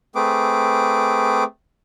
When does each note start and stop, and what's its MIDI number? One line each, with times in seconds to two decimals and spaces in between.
0.15 1.44 57
0.15 1.44 60
0.15 1.44 68
0.15 1.44 71
0.15 1.44 86